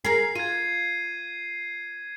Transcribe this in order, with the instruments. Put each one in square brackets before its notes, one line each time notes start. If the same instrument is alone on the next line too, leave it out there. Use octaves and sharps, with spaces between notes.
[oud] G#4 A#4 [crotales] C7
[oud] F4 [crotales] G#6 D#7